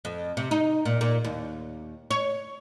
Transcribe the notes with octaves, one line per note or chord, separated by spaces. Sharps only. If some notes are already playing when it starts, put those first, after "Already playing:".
F2
C3
D#4
A#2
A#2
D#2
C#5